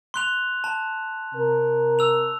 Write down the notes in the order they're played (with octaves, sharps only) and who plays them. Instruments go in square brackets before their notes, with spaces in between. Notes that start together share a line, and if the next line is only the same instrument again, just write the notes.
[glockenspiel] C6 F#6 F7
A5
[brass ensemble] C3 A#4
[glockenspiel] E6 F7